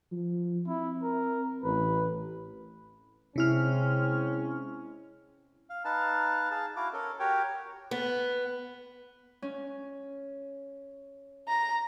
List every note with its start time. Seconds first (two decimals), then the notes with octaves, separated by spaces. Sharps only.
0.12 F3
0.67 C4 E4
1.03 A#4
1.63 A1 B4
3.36 C3 G#3 C4 C#4 E4 F6
5.70 F5
5.85 D#4 B4 F5 A5
6.51 G#4 F5 A5
6.76 E4 F#4 F5 D6
6.93 C#4 A4 A#4
7.19 F#4 G4 A#4 C#5 G5
7.91 B3
9.42 C#4
11.48 A#5